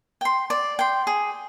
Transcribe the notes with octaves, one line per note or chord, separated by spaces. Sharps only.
G5 C6
D5
G5 C6
G#4